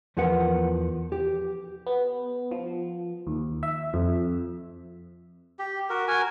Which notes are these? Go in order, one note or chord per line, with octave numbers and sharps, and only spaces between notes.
E2 F3 B3 A#4 F#5
G4
B3
F3
D#2
E5
F2
G4
F#4 A#4
F#4 A#4 G#5